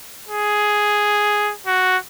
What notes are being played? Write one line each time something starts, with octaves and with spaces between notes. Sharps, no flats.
G#4
F#4